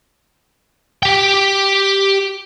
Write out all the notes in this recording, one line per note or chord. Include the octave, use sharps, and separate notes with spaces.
G4 G5